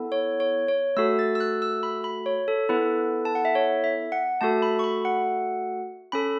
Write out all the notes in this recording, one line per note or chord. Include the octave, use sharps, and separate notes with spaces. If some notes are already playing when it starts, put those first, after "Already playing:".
Already playing: B3 E4 A4
C#5
C#5
C#5
A3 F#4 A4 E6
A6
E6
F#6
E6
B5
B5
C#5
A4
B3 E4 A4 B4
A5
F#5
E5
C#5
E5
F#5
A3 F#4 A4 A5
B5
C#6
B5
F#5
C#4 A4 B5